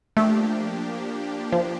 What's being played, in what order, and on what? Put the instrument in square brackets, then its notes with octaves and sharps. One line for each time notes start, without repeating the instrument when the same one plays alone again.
[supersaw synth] F3 A#3 D4 G4 [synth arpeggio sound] A3
[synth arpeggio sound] F3